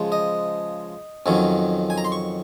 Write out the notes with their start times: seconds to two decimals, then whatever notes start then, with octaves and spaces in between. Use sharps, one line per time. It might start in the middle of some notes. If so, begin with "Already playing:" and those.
Already playing: C#3 F3 G#3 C#4
0.12 D#5
1.26 F2 D#3 F#3 C#4
1.90 G#5
1.98 A#5
2.05 C6
2.12 C#6